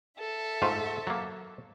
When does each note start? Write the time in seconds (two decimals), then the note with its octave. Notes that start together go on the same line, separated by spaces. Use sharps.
0.18 A4 E5
0.62 G#2 A3 F4
1.07 F#3 A#3